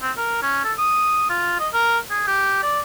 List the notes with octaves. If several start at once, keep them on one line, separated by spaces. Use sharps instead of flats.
C4
A#4
C#4
A4
D#6
F4
D#5
A#4
G#4
G4
D5